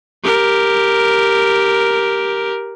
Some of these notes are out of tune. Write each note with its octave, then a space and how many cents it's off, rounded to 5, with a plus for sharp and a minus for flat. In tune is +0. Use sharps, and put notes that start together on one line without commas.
G4 +0 A#4 +0